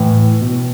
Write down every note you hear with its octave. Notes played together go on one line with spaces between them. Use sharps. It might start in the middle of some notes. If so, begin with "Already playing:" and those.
Already playing: A2 E3
B2